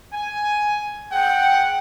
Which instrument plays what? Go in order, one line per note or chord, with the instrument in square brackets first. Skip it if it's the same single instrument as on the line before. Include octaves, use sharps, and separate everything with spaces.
[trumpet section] G#5
[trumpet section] G#4 F#5 [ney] G5